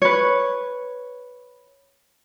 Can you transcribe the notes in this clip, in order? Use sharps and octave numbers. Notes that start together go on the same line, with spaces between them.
B4 C#5